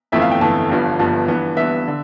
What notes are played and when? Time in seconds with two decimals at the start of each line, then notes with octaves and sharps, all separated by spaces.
0.12 G1 F2 E3 A3 E5
0.22 F5
0.31 G5
0.41 G1 F2 E3 A3 A5
0.70 G1 G2 F3 B3
0.99 G1 G2 F3 B3
1.28 G2 E3 B3
1.57 G2 E3 B3 E5
1.88 D3